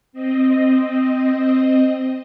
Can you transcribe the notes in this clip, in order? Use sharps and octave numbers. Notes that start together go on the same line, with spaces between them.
C4 D#5